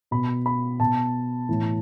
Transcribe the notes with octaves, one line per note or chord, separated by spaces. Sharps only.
B2 B5
B5
B2 A5
A2 E3